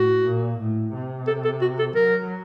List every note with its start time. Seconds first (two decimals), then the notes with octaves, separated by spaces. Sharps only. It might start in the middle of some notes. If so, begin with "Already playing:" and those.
Already playing: A2 F#4
0.26 A#2
0.59 A2
0.94 C3
1.27 A4
1.44 A4
1.61 F#4
1.79 A4
1.95 F#3 A#4